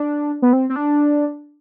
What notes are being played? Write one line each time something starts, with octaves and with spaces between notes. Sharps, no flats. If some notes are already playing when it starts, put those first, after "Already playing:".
Already playing: D4
B3
C4
C4
D4